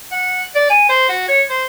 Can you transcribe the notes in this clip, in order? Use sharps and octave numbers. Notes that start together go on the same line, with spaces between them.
F#5
D5
G#5
C5
F#4
C#5
C5